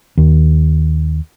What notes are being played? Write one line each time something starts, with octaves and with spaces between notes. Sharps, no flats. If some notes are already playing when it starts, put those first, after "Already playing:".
D#2